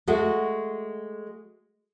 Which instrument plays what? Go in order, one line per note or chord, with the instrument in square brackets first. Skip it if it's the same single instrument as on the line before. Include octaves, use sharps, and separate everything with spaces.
[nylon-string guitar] G#3 A3 F#4